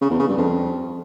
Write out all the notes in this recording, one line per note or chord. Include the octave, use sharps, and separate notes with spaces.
C#3
E2
C#3
G2
F2